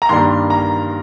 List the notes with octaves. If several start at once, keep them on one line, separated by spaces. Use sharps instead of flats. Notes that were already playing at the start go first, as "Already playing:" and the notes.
A#5
G2 D#3 A#3 D4 C6
A#5